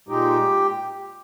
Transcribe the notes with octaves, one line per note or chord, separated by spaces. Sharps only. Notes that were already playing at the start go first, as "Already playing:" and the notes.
A#2 G#3 D#4 G4